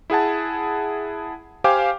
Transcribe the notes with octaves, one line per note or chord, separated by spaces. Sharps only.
E4 G#4 F#5 A5
G4 C5 F5 G5 G#5 D6